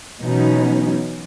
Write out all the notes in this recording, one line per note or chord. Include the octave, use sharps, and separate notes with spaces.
B2 E3 F#3 C#4 D#4